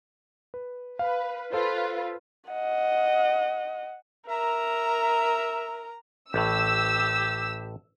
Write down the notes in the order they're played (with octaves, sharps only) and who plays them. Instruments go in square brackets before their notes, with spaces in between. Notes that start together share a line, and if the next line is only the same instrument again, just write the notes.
[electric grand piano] B4
[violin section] B4 [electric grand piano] F5
[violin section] F4 B4 [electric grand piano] A4 C5
[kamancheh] D#5 F#5
[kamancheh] A#4 [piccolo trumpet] E5 [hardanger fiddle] A#5
[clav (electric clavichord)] A1 A2 [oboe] G4 [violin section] E6